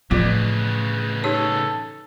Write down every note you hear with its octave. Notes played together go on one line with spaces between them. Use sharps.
A2 C#3 E3 F3 B3 F4
D#4 G4 A4 C#5